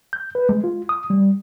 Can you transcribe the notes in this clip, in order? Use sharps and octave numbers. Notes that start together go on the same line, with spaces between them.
G6
B4
G#3
F4
D#6
G3